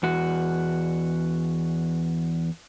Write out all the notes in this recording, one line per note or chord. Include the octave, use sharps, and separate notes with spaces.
E2 F#4